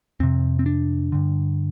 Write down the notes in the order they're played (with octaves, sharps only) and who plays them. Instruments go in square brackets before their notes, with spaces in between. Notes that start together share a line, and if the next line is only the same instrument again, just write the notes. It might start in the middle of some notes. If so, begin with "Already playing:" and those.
[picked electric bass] F2 C3 C4
C4
D4
G2 D3